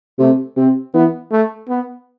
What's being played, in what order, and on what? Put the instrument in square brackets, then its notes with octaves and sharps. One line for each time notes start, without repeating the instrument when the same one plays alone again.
[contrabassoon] C3 [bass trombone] A3
[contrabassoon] C3 [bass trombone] C4
[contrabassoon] E3 [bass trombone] B3
[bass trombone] A3
B3